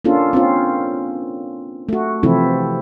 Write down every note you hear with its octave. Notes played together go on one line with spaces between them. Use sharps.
A#3 C#4 D4 F4 A4
C4 C#4 F4
A3 F#4
C3 E3 F3 C4 E4 A4